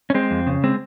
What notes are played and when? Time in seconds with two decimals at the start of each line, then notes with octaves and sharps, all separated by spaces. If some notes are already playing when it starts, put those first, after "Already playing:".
0.10 C#4
0.14 G#3 C4
0.31 F2
0.47 C#3
0.64 G#3 C4